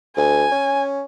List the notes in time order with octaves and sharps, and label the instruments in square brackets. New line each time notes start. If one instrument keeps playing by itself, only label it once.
[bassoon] D2 [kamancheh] G#5
[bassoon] C#4